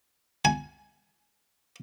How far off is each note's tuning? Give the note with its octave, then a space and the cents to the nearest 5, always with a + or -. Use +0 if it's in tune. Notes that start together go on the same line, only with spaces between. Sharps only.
G#5 +10